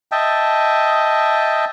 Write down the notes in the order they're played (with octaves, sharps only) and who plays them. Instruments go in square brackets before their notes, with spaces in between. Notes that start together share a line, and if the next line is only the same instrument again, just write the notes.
[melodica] D#5 E5 G5 A5